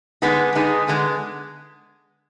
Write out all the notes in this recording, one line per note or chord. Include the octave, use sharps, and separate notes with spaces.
D3 G#3 B3 D#4 G#4
D3 G#3 B3 D#4 G#4
D3 G#3 B3